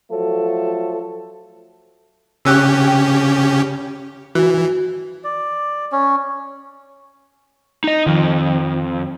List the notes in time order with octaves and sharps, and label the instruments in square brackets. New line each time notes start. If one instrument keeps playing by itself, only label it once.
[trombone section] F3 F#3 A3 A4
[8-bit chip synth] C#3 C#4 G4 [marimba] E6 F#6
[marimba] G5
[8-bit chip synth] E3 [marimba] F#4
[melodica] D5
C#4
[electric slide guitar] D#4 D#5
[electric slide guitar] F2 [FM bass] D#3